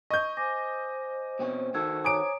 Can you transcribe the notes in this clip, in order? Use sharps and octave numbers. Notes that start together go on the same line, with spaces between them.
D#5 C#6 G6
C5 G#5 D6 A#6
B2 C4 C#4
D#3 F#4 A4 E6 G#6
C#5 G#5 A#5 D6 D#6 D7